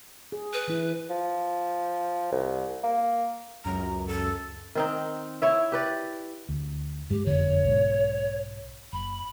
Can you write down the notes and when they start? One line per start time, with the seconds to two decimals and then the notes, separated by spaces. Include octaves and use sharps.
0.32 G#4
0.53 B4
0.68 E3 E4
1.10 F3
2.32 C2
2.84 A#3
3.64 C#2 F#2 A#5
4.07 A4
4.75 D#3 C4 D#4
5.42 E4 C#5 E5
5.72 G4 B4 D5
6.49 D2
7.10 G2 G#3 G4
7.26 F#1 F2 D3 C#5
7.63 B1 G#2
8.93 F#1 B5